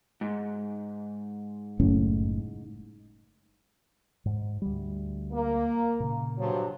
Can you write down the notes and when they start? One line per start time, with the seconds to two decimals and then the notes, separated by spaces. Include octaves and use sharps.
0.21 G#2
1.80 F#1 A2 C#4
4.25 G#2
4.62 D2 G3
5.33 A#3
6.00 A#2 C#3
6.38 G2 F3 F#3